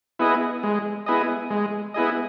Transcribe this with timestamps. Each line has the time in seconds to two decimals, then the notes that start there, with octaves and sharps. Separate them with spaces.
0.19 B3 E4 G#4 D#5
0.63 G#3
1.06 B3 E4 G#4 D#5
1.51 G#3
1.94 B3 E4 G#4 D#5